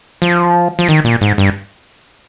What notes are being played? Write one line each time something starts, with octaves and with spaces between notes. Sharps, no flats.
F3
F3
D#3
A#2
G#2
G2